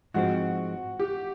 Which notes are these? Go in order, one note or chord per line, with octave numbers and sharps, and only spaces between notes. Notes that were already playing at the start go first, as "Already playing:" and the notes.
G#2 F3 G#3 C4 F#4
G4